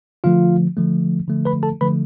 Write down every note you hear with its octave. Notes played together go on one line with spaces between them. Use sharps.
D3 F3 A3 F4 F5
D3 F3 A3
D3 F3 A3
B4 B5
A4 A5
D3 F3 A3 B4 B5